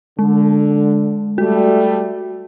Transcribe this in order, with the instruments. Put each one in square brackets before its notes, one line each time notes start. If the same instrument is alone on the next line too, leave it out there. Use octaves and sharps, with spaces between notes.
[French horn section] D3 [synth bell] G#3
[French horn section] G3 A3 [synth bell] F#4